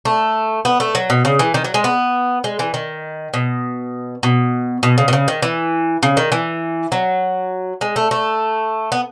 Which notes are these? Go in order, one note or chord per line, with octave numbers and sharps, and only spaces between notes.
A3
B3
A3
F#3
B2
C#3
E3
D#3
F#3
G#3
B3
G#3
E3
D#3
B2
B2
B2
C#3
B2
C#3
D#3
E3
C#3
D#3
E3
F#3
G#3
A3
A3
B3